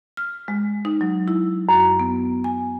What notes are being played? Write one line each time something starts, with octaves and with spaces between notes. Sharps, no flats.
F6
G#3
D#4
F#3
E4
F#2
B3
G#5